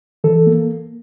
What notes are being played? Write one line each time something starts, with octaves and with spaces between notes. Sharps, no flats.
E3 A4
A#3